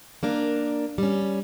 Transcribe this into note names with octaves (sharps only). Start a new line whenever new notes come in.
A#3 D4 A#4
G3 C#4